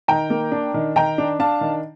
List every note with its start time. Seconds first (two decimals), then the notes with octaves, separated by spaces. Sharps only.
0.08 D#3 G5 A#5
0.30 A#3
0.52 D4
0.74 D#3
0.96 D#3 G5 A#5
1.18 D4
1.39 D4 F5 A5
1.61 D#3